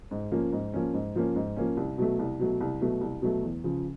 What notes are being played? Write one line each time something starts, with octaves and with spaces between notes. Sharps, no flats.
G#2
F3 A#3 C#4
G#2
F3 A#3 C#4
G#2
F3 A#3 C#4
G#2
F3 A#3 C#4
C2
B2 F#3 A3
C2
B2 F#3 A3
C2
B2 F#3 A3
C2
B2 F#3 A3
E2
C#3 F3